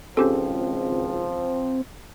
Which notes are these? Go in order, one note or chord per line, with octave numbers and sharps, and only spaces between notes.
G#1 C#2 F3 C4 C#4 G4 A4